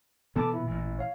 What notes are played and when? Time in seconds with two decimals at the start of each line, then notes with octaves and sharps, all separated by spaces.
0.36 B2 E3 B3 A4 A5 D6
0.54 A#2 E4
0.67 A1 E3
0.99 C#5 F5